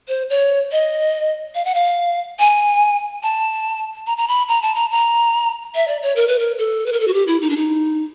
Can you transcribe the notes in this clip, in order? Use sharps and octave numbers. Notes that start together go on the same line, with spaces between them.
C5
C#5
D#5
F5
F#5
F5
G#5
A5
A#5
A#5
B5
A#5
A5
A#5
A#5
E5
D5
C#5
A#4
B4
A#4
A4
B4
A#4
A4
F#4
G4
E4
D#4
D4
D#4